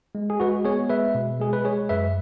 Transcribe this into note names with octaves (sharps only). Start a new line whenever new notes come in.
G#3
G#4
G#3 F#4 B4
B3 G#4 C#5
G#3 B4 E5
B2
G#3 G#4
B4
G#3 G#4 C#5
F#2 B4 E5